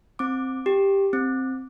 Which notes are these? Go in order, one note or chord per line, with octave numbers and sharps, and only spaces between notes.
C4 D6
G4
C4